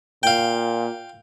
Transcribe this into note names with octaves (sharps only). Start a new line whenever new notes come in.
A#2 F5 G5